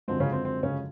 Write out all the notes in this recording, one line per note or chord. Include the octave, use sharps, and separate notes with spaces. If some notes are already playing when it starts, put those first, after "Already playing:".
F#2 D3 F3 G#3 C4
C#3 C#4
C4
C4
C#3 C#4